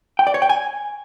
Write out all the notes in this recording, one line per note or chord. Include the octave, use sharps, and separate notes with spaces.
G5
D5
C#5
G5
G#5